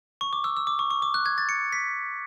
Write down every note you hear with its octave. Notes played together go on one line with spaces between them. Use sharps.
C#6
D6
E6
E6
D6
C#6
C#6
D6
F#6
G#6
A6
C#7
B6